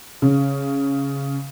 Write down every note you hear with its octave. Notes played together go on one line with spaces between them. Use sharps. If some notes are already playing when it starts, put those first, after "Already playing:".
C#3